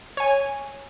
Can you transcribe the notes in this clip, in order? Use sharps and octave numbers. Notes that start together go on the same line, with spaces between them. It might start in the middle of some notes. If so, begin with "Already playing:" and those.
C#5 G#5